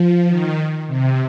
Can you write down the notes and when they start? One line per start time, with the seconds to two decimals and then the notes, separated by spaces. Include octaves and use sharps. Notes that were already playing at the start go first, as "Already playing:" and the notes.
Already playing: F3
0.27 D#3
0.87 C3